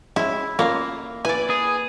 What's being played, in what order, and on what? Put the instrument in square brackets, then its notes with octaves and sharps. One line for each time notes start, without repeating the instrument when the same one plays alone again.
[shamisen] G#3 C#4 [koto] E4
[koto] A#3 [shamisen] C#4 E4 F4
[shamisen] E4 [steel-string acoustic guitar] B4 [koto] D5 G#5
[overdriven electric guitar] G#4